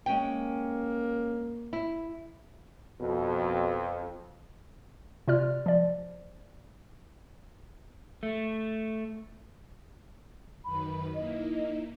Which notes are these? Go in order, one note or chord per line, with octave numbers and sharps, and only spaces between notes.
G#3 A#3 C#4 G5
E4
F2 B2
C3 F4 D5 F6
F3 D5
A3
F#2 D#3 B4 B5
A#3 D#4 E4 D#5